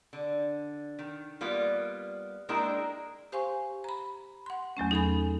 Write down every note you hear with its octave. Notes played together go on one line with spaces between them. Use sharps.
D3
D#3
G3 A#3 B3 F4
G#3 A#3 D4 E4 A#4 G5
G4 C5 F5 G#5 C6 C#6
A#5 B5
F#5 C6
E2 F#3 A3 C#4
D#4 G#4 A4 G#5 B5